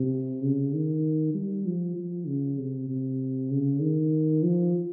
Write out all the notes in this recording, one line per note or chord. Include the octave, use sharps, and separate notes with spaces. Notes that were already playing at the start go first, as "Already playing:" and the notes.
Already playing: C3
C#3
D#3
G3
F3
F3
C#3
C3
C3
C#3
D#3
F3